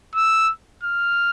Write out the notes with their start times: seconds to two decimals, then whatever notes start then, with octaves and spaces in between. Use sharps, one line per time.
0.15 E6
0.84 F6